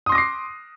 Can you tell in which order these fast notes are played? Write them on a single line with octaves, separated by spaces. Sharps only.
D#6 C6 A#6 D6 C7